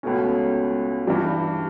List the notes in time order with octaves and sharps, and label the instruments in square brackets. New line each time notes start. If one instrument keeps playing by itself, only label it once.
[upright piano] C#2 B2 A3 C#4
G2 E3 G3